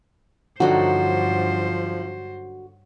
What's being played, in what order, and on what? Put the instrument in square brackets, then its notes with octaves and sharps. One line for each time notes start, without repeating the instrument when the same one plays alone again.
[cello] G2 C5 [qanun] D3 F#3 D#4 [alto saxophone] F3 [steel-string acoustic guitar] F#4